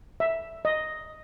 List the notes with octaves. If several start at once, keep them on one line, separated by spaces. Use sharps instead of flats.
E5
D#5